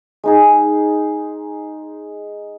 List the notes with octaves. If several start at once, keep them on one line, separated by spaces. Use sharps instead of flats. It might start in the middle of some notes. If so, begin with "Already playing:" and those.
G#3 D#4 G#4